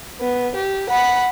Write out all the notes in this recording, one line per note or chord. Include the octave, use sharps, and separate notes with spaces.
B3
G4
F#5 B5